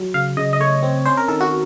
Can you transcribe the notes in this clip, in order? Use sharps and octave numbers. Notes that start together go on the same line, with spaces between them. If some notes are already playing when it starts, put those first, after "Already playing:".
Already playing: F#3
C#3 F5
C#3 D#5
D#5
A3 C#5
C4
C#4 C5
A#4
D#3 A4
F#4